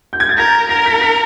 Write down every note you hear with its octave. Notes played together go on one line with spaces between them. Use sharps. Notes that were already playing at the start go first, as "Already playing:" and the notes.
G6
G#6
A6
A#4 A#6
A#4 A#6
B6
B6